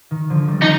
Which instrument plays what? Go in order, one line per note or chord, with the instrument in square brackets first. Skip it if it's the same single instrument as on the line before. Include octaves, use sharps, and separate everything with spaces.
[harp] D#3
D3 F3
D#3 G3
[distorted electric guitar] D#4